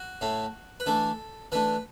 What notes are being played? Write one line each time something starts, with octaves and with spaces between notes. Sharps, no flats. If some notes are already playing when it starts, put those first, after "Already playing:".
Already playing: F#4
A2 A3 E4
B4
E3 A3 D4 A4
E3 A3 D4 B4